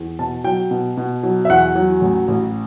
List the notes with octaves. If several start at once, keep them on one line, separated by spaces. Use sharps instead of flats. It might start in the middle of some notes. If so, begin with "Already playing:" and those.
Already playing: E2
B2 A5
F#3 G5
B2
B2
F#3
E5
E2 F#5
F#3
A1
A1